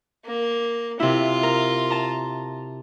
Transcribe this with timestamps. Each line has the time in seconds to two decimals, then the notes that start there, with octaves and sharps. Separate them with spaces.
0.25 A#3
1.00 C3 E4 F4
1.43 A#4
1.90 A5 A#5